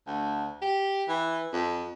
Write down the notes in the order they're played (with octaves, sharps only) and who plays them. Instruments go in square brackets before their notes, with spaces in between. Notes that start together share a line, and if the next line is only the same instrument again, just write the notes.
[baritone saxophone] D2
G4
E3
F2